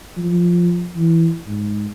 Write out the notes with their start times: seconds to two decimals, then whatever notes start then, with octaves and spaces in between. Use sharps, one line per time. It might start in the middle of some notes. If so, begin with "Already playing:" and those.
0.17 F3
0.96 E3
1.46 G#2